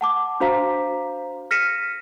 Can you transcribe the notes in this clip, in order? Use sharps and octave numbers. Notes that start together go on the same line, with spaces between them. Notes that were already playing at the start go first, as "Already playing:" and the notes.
F#5 A5 D6
D4 F#4 C5 F5 A#5 B6
F6 A#6 B6 C#7 D#7 E7